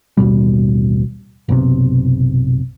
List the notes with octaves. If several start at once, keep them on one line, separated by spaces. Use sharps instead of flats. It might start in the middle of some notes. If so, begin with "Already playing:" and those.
A1 D#2 B2 G3
F#1 B1 C3